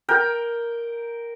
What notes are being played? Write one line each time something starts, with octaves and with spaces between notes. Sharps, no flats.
A#4 G5